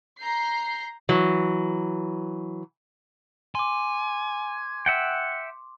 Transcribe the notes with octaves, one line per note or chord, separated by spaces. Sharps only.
A#5 G6 C7
E3 F#3
G#5 C6 D6
E5 F#5 G5